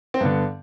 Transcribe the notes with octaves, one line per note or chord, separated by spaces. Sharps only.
C4
G2 D3 B3